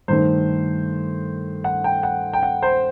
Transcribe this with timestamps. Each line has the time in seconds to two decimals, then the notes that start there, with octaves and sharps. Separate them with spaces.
0.08 G2 D#3 A3 C5
1.64 F#5
1.84 G5
2.03 F#5
2.33 G5
2.43 F#5
2.62 C5